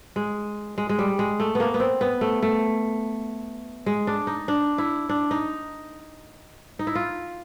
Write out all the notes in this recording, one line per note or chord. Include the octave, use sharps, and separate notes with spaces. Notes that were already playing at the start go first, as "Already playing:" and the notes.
G#3
G#3
G#3
G3
G#3
A3
A#3 B3
B3
C4
B3
A3
A3
G#3
D4
D#4
D4
E4
D4
D#4
D#4
E4
F4